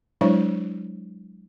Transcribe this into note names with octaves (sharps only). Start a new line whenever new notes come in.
F#3 G#3 D4 E4 C5 C#5